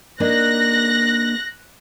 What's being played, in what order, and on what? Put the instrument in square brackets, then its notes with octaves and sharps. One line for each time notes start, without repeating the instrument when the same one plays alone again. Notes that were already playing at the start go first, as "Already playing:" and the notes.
[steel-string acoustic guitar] A#3 D4 D#4 [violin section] F#6 A#6